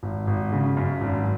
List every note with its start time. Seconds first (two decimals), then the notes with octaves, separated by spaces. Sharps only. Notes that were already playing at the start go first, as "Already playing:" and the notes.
0.03 G#1
0.27 G#1
0.52 C#3
0.77 F#2
1.01 G#1